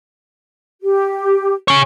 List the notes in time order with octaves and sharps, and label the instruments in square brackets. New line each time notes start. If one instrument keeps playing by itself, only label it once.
[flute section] G4
[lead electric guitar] G#4 C#5